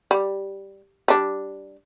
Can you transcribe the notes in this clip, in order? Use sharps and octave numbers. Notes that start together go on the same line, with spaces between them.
G3
G3 D4